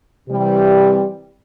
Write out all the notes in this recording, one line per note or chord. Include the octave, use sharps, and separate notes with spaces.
C3 E3 G3